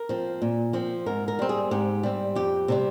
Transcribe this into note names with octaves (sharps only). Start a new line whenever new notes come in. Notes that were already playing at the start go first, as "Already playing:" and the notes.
Already playing: A#4
F3 C4
A#2
F3 C4
G#2 A#4
A#4
G3 C4
G#4
G#2 G4
G3 C4
F2 G4
C3 G3 C4